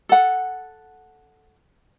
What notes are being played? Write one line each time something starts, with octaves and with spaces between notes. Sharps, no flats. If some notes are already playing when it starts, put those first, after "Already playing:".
A4 F#5